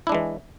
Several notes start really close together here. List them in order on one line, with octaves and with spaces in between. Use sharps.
E4 D4 G#3 E3